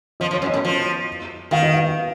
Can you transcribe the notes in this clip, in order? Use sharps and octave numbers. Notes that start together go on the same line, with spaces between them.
F3 D#5
F3
C#5
F#2
D#5
A2
F3
D#3 F5
D#5
F5